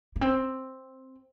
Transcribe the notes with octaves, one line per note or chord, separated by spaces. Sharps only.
A#3
C4